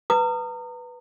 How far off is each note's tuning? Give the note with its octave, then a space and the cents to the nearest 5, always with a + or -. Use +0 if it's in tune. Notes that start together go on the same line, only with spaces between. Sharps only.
B4 +0 A#5 -35 D#6 -25